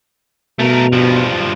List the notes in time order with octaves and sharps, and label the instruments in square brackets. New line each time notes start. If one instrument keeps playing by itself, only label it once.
[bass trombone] B2 [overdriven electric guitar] A3 A#4
[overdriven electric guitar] G2 F3